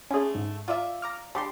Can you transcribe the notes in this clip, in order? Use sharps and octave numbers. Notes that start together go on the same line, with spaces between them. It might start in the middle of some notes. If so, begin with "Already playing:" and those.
D3 A3 C#4 G#4
G#2
F4 D5 E5
A#5 D6 F6
G3 G#3 D4 G4 C6